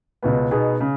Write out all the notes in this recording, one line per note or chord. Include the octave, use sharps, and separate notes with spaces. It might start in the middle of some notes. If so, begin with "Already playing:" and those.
C#2 B2 B3
B2 B3 D#4 G#4
C#3